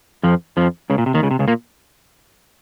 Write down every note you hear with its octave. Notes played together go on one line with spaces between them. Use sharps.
F2 F3
F2 F3
C#2 C#3
A#2
C3
D#2 D#3
C#2 C#3
C3
C#2 C#3
A#2 A#3